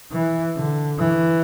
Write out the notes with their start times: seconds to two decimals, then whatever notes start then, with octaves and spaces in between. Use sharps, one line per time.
0.12 E3
0.56 D3
0.99 E3